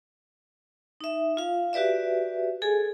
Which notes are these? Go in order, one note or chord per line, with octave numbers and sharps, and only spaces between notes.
D#4 E5
F4 F5
F#4 G4 B4 D5 E5
G#4 A4 G#5